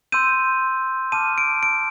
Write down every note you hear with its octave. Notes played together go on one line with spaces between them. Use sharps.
C6 E6 G6 D#7
A5 D6 F6 D#7
D7
D7